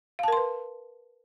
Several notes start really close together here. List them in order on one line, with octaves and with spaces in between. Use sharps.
F5 A5 A#4 C6 B4